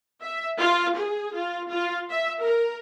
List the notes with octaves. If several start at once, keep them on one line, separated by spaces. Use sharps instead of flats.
E5
F4
G#4
F4
F4
E5
A#4